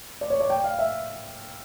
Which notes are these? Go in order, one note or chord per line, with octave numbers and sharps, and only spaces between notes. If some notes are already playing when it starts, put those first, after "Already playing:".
D5
C#5
D5
G5
F5
E5